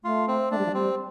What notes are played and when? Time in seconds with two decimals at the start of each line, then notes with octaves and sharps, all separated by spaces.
0.04 A3 F4
0.28 C4
0.51 A3 D4
0.58 G3
0.66 F3
0.72 G3 C4